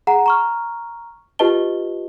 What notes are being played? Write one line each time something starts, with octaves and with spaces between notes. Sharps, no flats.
G#4 F#5 A#5
A#5 C#6 F6
F4 G4 B4 D#5 A5 G7